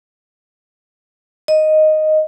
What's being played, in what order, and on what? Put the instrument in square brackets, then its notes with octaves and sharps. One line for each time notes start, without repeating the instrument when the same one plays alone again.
[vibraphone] D#5